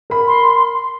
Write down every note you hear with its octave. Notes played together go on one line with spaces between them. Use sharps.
A#4 B5
C6